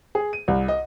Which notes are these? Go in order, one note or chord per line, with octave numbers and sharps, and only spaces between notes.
G#4
D#7
C2
D#5